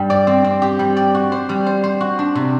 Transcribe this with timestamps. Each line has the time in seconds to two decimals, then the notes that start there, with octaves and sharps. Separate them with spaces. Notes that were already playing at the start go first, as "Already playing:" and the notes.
Already playing: G2 G3
0.10 D5
0.27 C4
0.44 C4
0.62 G4
0.79 G3
0.97 D5
1.15 F#4
1.32 C5
1.49 G3
1.66 C5
1.84 C5
2.01 F#4
2.19 D4
2.35 C3